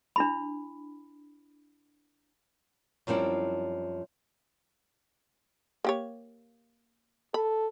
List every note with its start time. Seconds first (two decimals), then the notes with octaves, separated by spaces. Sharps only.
0.16 D4 E4 B5
3.07 F#2 F3 G3 C4 E4
5.84 A#3 G4 C#5
7.34 A4 B5